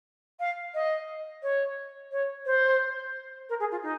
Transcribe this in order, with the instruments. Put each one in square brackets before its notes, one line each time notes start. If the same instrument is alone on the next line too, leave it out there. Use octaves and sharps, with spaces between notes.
[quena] F5
D#5
C#5
C#5
C5
A#4
G#4
F4
D#4